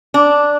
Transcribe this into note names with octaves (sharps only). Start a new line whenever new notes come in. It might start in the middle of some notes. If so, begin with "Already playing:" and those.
D4